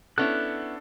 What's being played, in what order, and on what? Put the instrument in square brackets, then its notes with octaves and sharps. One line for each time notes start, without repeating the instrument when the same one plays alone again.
[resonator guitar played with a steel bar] B3 C#4 E4 [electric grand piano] D4 A4 [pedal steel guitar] F#6